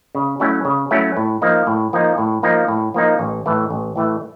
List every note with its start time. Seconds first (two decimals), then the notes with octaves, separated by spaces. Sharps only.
0.15 C#3
0.40 F#3 A3 C#4 E4
0.65 C#3
0.91 F#3 A3 C#4 E4
1.17 A2
1.42 F3 A#3 D#4
1.67 A2
1.93 F3 A#3 D#4
2.18 A2
2.43 F3 A#3 D#4
2.68 A2
2.94 F3 A#3 D#4
3.19 A1
3.46 A2 E3 A3
3.70 A1
3.96 A2 E3 A3